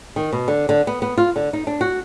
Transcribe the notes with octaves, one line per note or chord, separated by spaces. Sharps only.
D#3
B2
D3
D3
B3
B3
F4
D3
D#4
D4
F#4